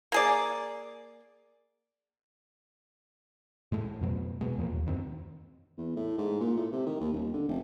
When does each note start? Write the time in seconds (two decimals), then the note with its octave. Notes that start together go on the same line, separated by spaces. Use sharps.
0.12 A#3 G#4 D5
3.72 A2 G#3 A3
4.01 F2 B2 F#3
4.41 B2 G#3
4.58 E2 A#2 F3 A#3
4.73 D#2
4.86 F#2 D#3 C4
5.78 E2
5.96 A2
6.18 G#2
6.40 A#2
6.57 A2
6.72 C3
6.86 D#3
7.00 D#2
7.13 D#1
7.33 D3
7.48 F1